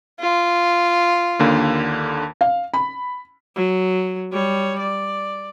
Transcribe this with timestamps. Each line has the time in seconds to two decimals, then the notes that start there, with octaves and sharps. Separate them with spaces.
0.20 F4
1.39 D#2 D3 A#3
2.41 F5
2.74 B5
3.55 F#3
4.32 G3 C#5
4.79 D5